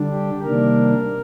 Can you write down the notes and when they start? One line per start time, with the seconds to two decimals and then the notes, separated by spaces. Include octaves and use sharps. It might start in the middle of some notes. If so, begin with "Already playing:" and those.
Already playing: D3 G3 D4
0.11 G4
0.43 C3 D#3 G3 A#3 D4 A#4